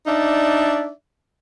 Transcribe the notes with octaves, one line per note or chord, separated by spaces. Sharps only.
D4 D#4 D5 E5